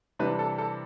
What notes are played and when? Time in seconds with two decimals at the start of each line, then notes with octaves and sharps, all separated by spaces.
0.19 C3 E3 G3 D4 B4
0.39 A4
0.58 A4